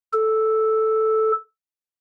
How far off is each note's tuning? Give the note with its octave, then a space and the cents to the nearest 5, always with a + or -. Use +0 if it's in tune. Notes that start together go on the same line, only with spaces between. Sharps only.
A4 -5